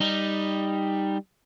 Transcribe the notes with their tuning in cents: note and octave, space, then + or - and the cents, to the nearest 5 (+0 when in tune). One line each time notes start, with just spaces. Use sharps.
G3 +10 D#4 +0